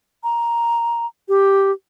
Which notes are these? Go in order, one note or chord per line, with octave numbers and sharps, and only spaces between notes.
A#5
G4